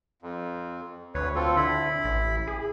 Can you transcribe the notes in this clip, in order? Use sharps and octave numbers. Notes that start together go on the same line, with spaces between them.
F2
D2 B4 C#5
C4 F4 A4
D3 E4 B5
A1
G#4